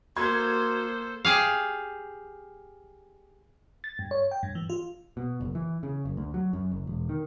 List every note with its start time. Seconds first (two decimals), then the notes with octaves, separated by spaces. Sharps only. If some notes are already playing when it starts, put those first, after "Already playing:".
0.16 A#3 F#4 A4 C5 C6 G#6
1.25 G4 G#4 F5
3.84 A6
3.99 G2
4.11 C#5
4.31 G5
4.43 G2
4.55 E3
4.70 F4
5.17 B2
5.41 F#1
5.55 E3
5.83 C#3
6.05 F#1
6.17 D2
6.34 F#3
6.53 F#2
6.71 F#1
6.87 E1
7.09 D#3